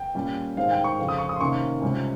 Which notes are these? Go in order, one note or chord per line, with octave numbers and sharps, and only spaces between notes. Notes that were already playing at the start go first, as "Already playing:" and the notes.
Already playing: G5
A#2 G3 C#4
G#2 D#3 G#3 C4 F5
G5
C#6
F2 C#3 F3
D#6
C#6
D#6
C6
C3 D#3 A#3 C#4 C#6
C#2 C3 G3 C#4